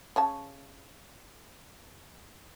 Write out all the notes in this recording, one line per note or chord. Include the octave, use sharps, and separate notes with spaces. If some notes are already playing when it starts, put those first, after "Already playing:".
C#3 C#5 A5